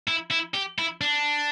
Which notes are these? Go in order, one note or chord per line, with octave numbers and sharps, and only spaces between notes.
E4
E4
G4
E4
D4